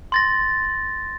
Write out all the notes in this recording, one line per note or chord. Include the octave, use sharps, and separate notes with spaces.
C6 A6 A#6